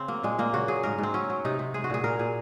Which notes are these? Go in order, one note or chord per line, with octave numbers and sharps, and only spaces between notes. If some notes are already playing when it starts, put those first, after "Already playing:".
Already playing: C#3 C4
F#3 A#3
A#2 G#3
A#2 A#3
C#3 F#4
F#3 G#4
G#2 A#4
G#2
C4
F#3 C#4
F#3
C3 D#4
C3
G#3 G#4
F#4
A#2 G#4
A#2 A#4
A#2 G#4